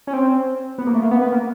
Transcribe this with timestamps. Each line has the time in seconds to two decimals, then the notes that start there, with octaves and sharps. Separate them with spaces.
0.07 C#4
0.13 C4
0.78 B3
0.87 A#3
0.94 A3
1.03 A#3
1.11 B3
1.22 B3
1.32 A#3